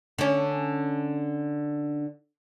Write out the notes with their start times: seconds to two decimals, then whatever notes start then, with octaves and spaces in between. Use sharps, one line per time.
0.18 D3 C#4